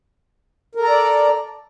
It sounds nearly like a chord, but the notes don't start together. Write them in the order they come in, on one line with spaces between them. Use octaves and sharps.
A#4 A4 A#5 D5